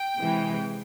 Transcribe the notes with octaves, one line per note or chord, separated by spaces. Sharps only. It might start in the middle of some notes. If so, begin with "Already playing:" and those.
Already playing: G5
C3 E3 G#3